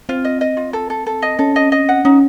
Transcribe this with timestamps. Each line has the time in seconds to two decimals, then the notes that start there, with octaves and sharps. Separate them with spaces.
0.09 C4 F4
0.25 D#5
0.41 D#5
0.57 F4
0.73 A4
0.90 A4
1.06 A4
1.22 D#5
1.39 C#4 A4
1.56 D#5
1.72 D#5
1.89 F#5
2.05 C#4 D#4